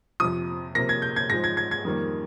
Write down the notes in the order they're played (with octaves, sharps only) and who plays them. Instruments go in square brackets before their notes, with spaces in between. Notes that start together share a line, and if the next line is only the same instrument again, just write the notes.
[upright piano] F2 C3 F3 D#6
C3 F3 A#3 A#6
G#6
G6
G#6
G#2 F3 G#3 A#6
G#6
G#6
G#6
F2 D#3 G3 A#3